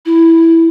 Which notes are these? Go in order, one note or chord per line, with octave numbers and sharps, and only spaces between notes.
E4